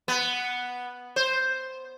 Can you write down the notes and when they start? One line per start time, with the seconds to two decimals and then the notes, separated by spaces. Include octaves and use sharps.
0.08 B3
1.16 C5